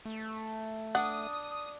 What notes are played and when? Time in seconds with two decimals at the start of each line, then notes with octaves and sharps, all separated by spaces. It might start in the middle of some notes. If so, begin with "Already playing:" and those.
0.05 A3
0.95 D4 F#5 D#6